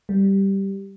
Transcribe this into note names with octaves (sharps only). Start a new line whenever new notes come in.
G3